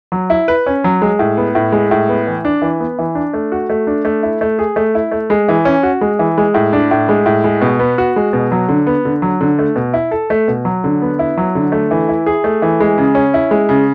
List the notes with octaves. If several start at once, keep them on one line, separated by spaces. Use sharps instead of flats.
F#3
E4
B4
C#4
F#3
G#3
A2
B3
A2
G#3
A2
B3
E3
D4
E3
B3
E3
D4
A3
F#4
A3
D4
A3
E4
A3
G#4
A3
E4
A3
G#3
E3
C#4
F#4
G#3
E3
G#3
A2
D4
A2
G#3
A2
G#3
B2
B3
F#4
G#3
B2
F#3
D3
B3
D3
F#3
D3
A3
B2
E4
A4
A3
B2
F#3
D3
B3
E4
F#3
D3
A3
E3
E4
G#4
A3
E3
G#3
C#3
C#4
E4
G#3
C#3